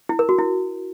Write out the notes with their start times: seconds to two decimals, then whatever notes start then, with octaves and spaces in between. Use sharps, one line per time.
0.09 E4
0.19 A#4
0.29 F#4
0.38 E4